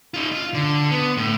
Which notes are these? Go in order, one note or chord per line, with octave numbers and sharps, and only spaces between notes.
D#4 F4
F4
D3
B3
A2